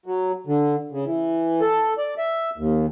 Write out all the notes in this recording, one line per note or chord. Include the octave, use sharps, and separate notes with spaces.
F#3
D3
C#3
E3
A4
D5
E5
D#2